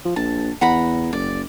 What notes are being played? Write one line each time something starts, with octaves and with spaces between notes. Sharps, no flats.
F3
A#1 A5
E2 F#5 A#5 B5
F#1 D5